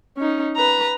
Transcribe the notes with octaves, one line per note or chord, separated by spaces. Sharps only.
C#4 D#4
B4 A#5